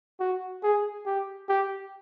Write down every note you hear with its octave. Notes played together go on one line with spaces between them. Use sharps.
F#4
G#4
G4
G4